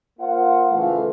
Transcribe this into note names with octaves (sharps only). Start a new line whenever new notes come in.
A#3 F4 C5 F5 F#5
C#2 A#2 E3 A3 F4 F5